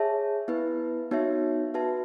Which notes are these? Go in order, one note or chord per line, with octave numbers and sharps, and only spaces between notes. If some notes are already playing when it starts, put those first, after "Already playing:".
Already playing: G#4 C#5 E5 A5
B3 E4 B4 E5
B3 D#4 F#4 C#5 E5
F#4 B4 E5 A5